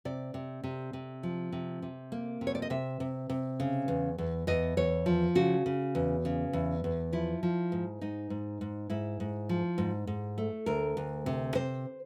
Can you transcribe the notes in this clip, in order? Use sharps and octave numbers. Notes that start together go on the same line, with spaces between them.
C3 D5
C3
C3
C3
F3
C3
C3
A#3
C3
C#5
D5
D#5
C3 E5
C3
C3
C#3
E2
E2
E2 D#5
E2 C#5
F3
C#3 F#4
C#3
E2
C#3
E2
E2
F3 E4
F3
G#2
G#2 D#4
G#2
G#2
G#2 E4
G#2
F3
G#2
G#2
A3
D2 A#4
D2
C3
C3 C5